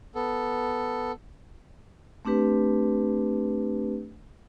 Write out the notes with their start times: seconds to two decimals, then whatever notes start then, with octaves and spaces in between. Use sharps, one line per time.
0.15 B3 A4
2.25 A3 C4 D4 G4 B4